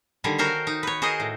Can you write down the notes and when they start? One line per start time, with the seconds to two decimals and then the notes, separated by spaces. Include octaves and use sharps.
0.24 D3 D#3 G3 G#5
0.38 F#4 A#4 C5 C#5 F5
0.67 D#4
0.83 B4 C#5
1.02 F#4 G#4 A#4 C5 D#5
1.20 A2